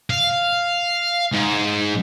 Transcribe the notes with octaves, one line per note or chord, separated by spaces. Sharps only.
F5
G#2